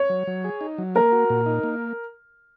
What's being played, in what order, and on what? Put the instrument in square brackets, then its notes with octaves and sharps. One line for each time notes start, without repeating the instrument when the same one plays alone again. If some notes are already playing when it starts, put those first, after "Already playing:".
Already playing: [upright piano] C#5
[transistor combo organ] F#3
F#3
G#4
D#4
F#3
[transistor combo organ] A#3 [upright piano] A#4
[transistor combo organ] F#4
A#2
D#4
A#3